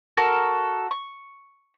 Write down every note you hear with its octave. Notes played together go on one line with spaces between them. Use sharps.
F#4 A4 A#4
C#6